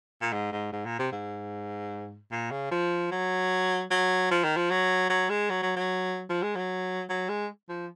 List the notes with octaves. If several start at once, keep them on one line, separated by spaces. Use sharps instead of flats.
A#2
G#2
G#2
G#2
A#2
C3
G#2
A#2
C#3
F3
F#3
F#3
F3
D#3
F3
F#3
F#3
G#3
F#3
F#3
F#3
F3
G#3
F#3
F#3
G#3
F3